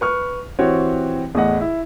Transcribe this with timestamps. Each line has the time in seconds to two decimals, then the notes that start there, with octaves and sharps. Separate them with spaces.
0.01 B4 C#6 F6
0.59 E3 C4 F#4 G4 C#5
1.35 E2 A2 D#5 F#5
1.61 E4